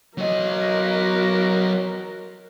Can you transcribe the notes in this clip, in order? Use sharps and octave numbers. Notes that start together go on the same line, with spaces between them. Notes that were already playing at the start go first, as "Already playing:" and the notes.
F#3 F#4 A#4 D#5